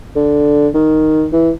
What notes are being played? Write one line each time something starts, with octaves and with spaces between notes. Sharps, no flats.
D3
D#3
E3